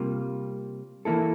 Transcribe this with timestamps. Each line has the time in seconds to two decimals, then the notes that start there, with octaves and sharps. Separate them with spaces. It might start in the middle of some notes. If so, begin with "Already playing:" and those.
Already playing: C3 G3 A#3 F4
1.05 E3 A#3 E4 A4